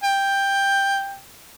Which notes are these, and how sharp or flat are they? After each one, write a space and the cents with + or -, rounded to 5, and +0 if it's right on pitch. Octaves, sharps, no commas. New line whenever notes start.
G5 +10